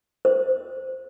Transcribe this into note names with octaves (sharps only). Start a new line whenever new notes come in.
C5